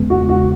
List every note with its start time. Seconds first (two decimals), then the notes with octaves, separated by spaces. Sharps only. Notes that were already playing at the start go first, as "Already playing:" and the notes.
Already playing: E2 C#3 G#3 B3
0.10 F#4
0.29 F#4